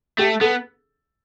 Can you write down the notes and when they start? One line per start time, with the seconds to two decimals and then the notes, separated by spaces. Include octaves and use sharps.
0.18 A3 G4
0.41 B3 A4